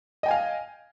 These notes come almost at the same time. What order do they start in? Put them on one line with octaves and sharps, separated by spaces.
D#5 G5 G#5 F5